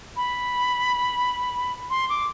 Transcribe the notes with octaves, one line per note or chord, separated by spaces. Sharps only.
B5
C6
D6